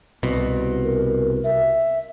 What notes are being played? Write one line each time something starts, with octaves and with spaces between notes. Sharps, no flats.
C2 B2
A#4
E5